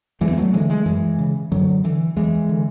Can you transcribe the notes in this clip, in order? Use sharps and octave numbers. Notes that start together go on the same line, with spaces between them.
E2 E3 G#3
B3
F#3 A3
D3 E3 G#3
E3 G#3
F#2 E3 G#3
C#3
F#2 D3 F#3
D3 E3
E2 E3 G#3
D3